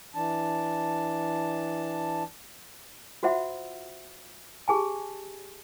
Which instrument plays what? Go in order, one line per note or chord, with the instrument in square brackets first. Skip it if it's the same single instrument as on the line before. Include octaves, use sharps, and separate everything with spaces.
[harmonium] E3 D4 A5
[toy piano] F4 F#4 C5 E5 F#5
G4 G#4 G#5 A5